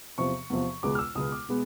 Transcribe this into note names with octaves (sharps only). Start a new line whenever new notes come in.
E2 C3 F3 C#6
E2 C3 F3
C#2 B2 G#3 B3 D6
F6
E6
C#2 B2 G#3 B3 D#6
D6
B2 G#3 B3